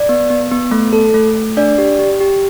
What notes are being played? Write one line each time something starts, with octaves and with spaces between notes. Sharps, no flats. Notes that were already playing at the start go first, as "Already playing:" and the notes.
Already playing: D5
B3
B3
B3
A3
A4
A3
A3
D4 D5
G4
G4
G4